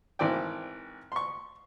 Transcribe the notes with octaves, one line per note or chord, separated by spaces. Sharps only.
G#1 E3 C5 D5 G5
C6 C#6